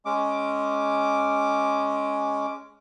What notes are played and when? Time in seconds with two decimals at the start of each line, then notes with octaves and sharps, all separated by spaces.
0.05 G#3 C#4 D6